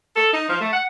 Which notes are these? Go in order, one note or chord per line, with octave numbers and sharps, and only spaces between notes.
A4
D#4
F3
A3
F#5